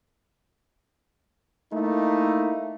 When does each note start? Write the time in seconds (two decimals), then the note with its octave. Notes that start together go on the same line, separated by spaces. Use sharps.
1.72 A3 A#3 D#4 E4